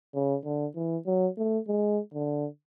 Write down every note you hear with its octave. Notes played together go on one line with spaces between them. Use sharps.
C#3
D3
E3
F#3
A3
G#3
D3